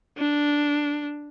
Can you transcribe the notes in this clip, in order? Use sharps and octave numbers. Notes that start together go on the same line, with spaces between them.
D4